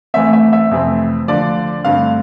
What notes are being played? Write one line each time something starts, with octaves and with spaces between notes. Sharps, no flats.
A1 A2 E3 A3 C4 E5
E5
E5
F2 C3 E3 A3 C4
D2 D3 F3 D5
G2 D3 A3 C4 F5